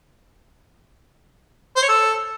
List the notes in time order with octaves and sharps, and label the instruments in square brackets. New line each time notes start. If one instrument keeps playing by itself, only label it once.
[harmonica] C5
C#5
A4